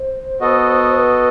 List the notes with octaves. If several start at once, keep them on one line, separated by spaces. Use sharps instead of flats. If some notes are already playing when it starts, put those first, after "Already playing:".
Already playing: C5
B3 F#4 A4 D#5
B4